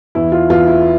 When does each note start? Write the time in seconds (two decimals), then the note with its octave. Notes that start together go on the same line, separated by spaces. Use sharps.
0.15 E2 E4
0.32 F4
0.50 E2 F4
0.67 E4